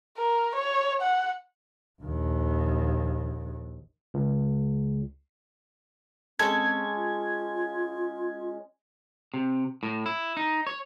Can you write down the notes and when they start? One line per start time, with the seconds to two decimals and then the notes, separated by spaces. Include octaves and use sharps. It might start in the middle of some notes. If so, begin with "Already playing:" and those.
0.18 A#4
0.55 C#5
1.01 F#5
2.00 A#1 D#2
4.14 C#2
6.39 G#3 C4 C#4 A4 G#6
6.96 F4
9.34 C3
9.83 A2
10.06 E4
10.37 D#4
10.67 C#5